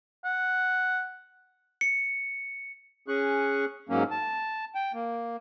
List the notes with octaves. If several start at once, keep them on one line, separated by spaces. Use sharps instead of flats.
F#5
C#7
C#4 G#4 C#6 F#6
G#2 F#3 A#3 C#4
A5
G5
A#3